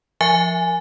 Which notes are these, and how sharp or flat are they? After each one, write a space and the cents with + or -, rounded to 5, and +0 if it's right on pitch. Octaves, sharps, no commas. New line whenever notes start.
F3 +0 E5 +0 G#5 +0